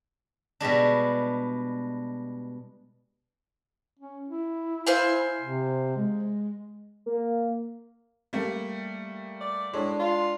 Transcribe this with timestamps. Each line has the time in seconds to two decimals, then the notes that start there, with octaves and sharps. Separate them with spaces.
0.60 B2 G3 G#3 D4
3.99 C#4
4.28 E4
4.86 C5 F5 G#5
5.41 C3
5.96 G#3
7.06 A#3
8.33 G3 A3 A#3
9.41 D5
9.74 A2 G#3 D4
10.00 F4